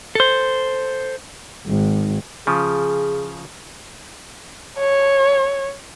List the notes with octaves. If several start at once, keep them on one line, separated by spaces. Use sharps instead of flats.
A4 C5
G#1
C#3 F3 G#4
C#5